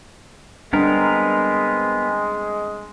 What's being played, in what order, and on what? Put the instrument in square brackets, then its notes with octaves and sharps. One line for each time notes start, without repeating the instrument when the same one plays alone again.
[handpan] G3 D4 [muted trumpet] G#3 [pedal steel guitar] B3 C4 A#4